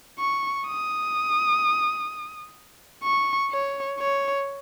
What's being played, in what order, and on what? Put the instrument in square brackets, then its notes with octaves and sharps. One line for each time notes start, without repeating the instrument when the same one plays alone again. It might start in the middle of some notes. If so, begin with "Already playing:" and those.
[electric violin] C#6
D#6
C#6
C#5
C#5